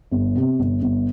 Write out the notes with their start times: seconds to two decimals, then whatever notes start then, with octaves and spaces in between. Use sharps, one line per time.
0.11 G1
0.35 C3
0.59 G1
0.82 G1